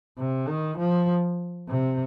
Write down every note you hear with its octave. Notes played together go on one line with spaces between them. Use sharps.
C3
D#3
F3
C3